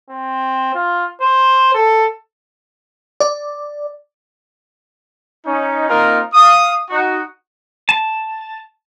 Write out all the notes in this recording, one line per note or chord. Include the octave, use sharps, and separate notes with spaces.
C4
F4
C5
A4
D5
C#4 D#4
A#3 C4 D#4 F4 A#4
F5 D#6
D#4 F#4
A5